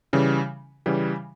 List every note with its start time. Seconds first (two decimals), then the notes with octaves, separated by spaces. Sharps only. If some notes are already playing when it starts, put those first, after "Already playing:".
0.13 C#3 E3 G3
0.86 C#3 E3 G3